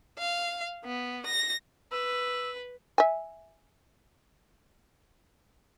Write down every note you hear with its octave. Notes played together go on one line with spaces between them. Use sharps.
F5
B3
A#6
B4 E6
E5 G#5